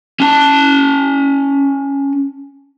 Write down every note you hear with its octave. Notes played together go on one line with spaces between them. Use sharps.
C#4 A5